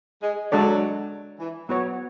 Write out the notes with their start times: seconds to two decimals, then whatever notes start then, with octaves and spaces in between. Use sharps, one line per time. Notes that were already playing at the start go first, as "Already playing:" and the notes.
0.23 G#3
0.52 F#3 G#3 D4 A4 D5
1.40 E3
1.69 F#3 B3 F#4 C#5